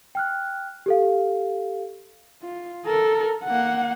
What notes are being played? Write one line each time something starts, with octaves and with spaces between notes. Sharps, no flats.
G5 F6 F#6
G4 A4 F5
F4
A4 A#4
A#3 F#5